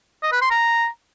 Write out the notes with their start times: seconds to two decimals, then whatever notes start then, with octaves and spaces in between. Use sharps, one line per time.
0.23 D#5
0.32 B4
0.41 C6
0.51 A#5